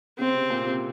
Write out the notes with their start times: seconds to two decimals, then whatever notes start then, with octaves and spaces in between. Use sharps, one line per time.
0.19 C#3 C4
0.34 C3
0.50 A#2
0.65 C3